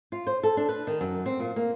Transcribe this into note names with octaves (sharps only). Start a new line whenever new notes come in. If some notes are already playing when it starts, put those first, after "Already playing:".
F4
C5
A4
D4
B4
D#3
F#2
C4
A#2
A#3